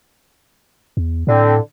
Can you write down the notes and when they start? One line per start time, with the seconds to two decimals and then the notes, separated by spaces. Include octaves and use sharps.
0.97 E2
1.27 A2 D3 C4